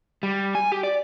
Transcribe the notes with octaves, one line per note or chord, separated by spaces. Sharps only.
G3
G#5
G4
D5